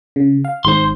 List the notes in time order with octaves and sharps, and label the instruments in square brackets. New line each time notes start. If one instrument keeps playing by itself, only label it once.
[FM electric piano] C#3
F5
[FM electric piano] G#1 G#2 [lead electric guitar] C5 C6